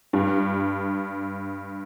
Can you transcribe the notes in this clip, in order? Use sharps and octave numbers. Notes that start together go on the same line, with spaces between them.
G2